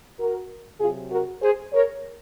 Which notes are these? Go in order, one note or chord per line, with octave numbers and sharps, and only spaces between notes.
F#4 A#4
C3 F#3 F4 G#4
F#4 A#4
G#4 C5
A#4 C#5